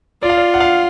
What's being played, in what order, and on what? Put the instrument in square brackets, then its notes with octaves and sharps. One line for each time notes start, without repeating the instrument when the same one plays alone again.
[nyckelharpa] F4 [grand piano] D5
[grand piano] F5
D5
F#5
F5